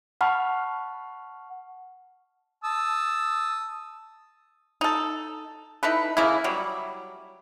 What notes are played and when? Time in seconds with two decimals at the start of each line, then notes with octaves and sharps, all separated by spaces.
0.21 F#5 A5 B5 C#6 F6
2.64 A5 D#6 E6
4.81 D#4 A4
5.83 D#4 E4 A4 B4
6.17 C#3 A#3 E4
6.44 F#3 G3